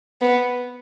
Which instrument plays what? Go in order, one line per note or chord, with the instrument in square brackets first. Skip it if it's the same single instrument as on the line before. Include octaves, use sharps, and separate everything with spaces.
[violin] B3